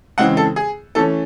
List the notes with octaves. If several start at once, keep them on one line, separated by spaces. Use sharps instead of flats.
C#3 E3 G#3 C4 F#5
A4
G#4
E3 A3 C#4 A4